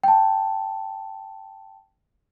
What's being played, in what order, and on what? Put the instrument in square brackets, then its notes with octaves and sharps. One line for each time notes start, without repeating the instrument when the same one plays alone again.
[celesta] G5 A5